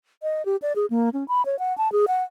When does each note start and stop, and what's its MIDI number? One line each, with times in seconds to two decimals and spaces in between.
0.23 0.45 75
0.46 0.56 67
0.62 0.73 74
0.76 0.86 68
0.90 1.09 58
1.13 1.26 61
1.28 1.45 83
1.45 1.58 73
1.59 1.76 78
1.78 1.91 81
1.92 2.06 68
2.08 2.23 78